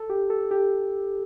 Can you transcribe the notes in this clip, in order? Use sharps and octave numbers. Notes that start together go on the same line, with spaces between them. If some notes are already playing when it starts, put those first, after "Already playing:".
Already playing: A4
G4
A4
G4